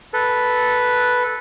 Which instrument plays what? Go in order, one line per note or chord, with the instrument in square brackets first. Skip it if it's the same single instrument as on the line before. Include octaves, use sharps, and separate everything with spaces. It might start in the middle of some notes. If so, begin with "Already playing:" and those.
[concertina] A4 B4